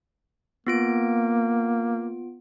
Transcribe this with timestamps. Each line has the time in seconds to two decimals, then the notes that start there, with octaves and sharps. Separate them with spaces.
0.67 A#3 B3 F4 D7